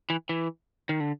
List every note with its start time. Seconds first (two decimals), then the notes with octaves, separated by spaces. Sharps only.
0.10 E3
0.29 E3
0.89 D#3
1.00 D3